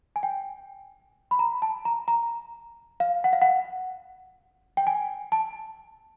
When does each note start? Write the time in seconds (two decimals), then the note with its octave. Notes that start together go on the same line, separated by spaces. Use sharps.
0.16 G#5
0.23 G5
1.31 B5
1.39 A#5
1.62 A5
1.85 A#5
2.08 A#5
3.00 F5
3.24 F#5
3.33 F5
3.42 F#5
4.77 G5
4.87 G#5
5.32 A5